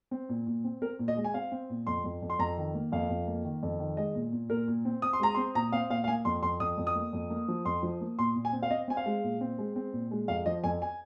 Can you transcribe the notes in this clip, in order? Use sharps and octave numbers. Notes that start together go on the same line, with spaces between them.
C4
A#2
A#2
C4
C4 A#4
A#2
D#5
G#3
G#5
C4 F5
C4
A#2
F2 C6
F2
F2
C6
F2 A#5
D#3
A#3
F2 F5
F2
A#3
D#3
F2
D#3
G#3 D#5
A#2
A#2
A#2 A#4
A#2
C4
C4 D#6
C6
G#3 A#5
C6
C4
A#2 A#5
C4 F5
A#2 F5
F5
A#3 G#5
F2 C6
F2 C6
F2 D#6
F2
D#6
A#3
F2
A#3
F3
F2 C6
F3
A#3
A#2 C6
A#2
G#5
C4
F5
C4 D#5
C4 G#5
F5
G#3
A#2
C4
G#3
C4
A#2
G#3
F2 F5
F3 D#5
F2 G#5
G#5